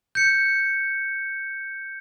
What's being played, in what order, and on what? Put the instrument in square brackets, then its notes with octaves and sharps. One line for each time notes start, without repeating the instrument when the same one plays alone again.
[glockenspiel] G6 C#7